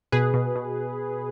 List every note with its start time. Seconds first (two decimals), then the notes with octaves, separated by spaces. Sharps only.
0.12 B2 G#4 B4
0.34 B2
0.56 B2